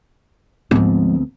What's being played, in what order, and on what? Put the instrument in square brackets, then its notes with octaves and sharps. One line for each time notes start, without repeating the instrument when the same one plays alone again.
[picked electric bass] D2 B3 C4 [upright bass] G#2 F3